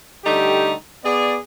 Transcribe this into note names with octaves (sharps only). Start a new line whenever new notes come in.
D3 G3 A3 D#4 G4
B3 G#4 D5